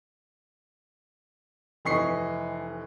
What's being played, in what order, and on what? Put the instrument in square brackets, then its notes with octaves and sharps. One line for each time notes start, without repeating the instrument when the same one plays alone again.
[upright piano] F1 E3 D#5 C#6 C7